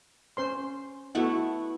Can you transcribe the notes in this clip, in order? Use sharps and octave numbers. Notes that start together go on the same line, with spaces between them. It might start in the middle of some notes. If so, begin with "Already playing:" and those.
C#4 C5 C6
A3 B3 E4 F#4 A4 F#5